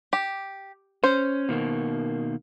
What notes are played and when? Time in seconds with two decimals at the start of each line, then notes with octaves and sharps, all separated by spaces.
0.13 G4
1.04 C#4 C5
1.49 B2 D#3 A#3